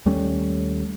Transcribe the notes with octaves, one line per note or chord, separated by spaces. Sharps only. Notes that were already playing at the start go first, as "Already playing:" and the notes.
D#2 G3 A3 C#4